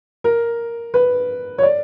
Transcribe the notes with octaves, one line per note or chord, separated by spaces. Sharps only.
A#4
B4
C#5
D5